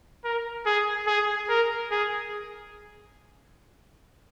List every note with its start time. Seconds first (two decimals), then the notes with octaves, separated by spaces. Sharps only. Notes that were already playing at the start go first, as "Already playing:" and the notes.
0.25 A#4
0.66 G#4
1.07 G#4
1.49 A#4
1.91 G#4